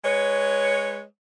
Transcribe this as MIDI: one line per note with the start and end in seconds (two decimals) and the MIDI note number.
0.05 1.02 56
0.05 1.02 71
0.05 1.02 73